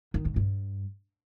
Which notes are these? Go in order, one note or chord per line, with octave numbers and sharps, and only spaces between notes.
D#3
G#2
G2